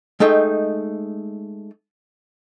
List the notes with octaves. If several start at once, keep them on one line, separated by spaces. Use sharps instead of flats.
G#3 A3 D#4 G5